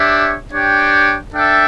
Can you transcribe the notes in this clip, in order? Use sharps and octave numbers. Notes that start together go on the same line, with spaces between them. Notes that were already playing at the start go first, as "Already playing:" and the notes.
Already playing: D4 G4 C#5 E5
D4 G4 C#5 G5
D4 A4 E5 G5